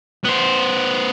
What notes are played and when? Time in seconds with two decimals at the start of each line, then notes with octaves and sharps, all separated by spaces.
0.24 B3 C5